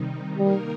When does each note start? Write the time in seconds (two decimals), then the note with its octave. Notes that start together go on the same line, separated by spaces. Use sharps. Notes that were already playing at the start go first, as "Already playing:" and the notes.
Already playing: C3 D#3 G3 D#4
0.38 D#3 G3 A#3 D#4 A#4